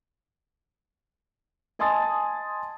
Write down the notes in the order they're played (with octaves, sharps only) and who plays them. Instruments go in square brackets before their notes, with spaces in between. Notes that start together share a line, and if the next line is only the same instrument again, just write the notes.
[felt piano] D#5 G#5 A5 C6 D#6 A6